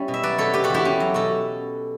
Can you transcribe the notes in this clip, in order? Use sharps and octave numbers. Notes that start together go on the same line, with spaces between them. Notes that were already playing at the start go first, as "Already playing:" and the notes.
Already playing: G3 C#4 E4 C#5
B2
E5
F#3 B4 D5
B2 A4 C#5
B2 G4 B4
F#4 A4
E2 E4 G4
E2 C#4
F#3
B2 F#4 A4